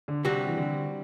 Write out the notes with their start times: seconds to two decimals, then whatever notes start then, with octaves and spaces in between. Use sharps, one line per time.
0.08 D3
0.25 C3 G3 C4 F#4
0.47 E3
0.57 D3